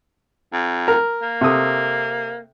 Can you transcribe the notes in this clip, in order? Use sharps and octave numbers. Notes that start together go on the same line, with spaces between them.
F2
A#4
A#3
C3 A4 D#6